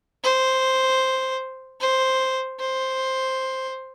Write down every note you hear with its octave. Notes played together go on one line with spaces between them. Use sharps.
C5
C5
C5